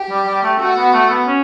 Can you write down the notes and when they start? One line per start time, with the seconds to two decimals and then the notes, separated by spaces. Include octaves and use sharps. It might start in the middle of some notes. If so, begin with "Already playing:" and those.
Already playing: G4
0.09 G3
0.27 G3
0.43 A3
0.59 A3 F#4
0.77 B3
0.94 A3
1.10 B3
1.27 C#4